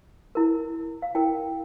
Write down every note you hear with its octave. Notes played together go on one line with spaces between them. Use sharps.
E4 A#4
F5
E4 A#4 G5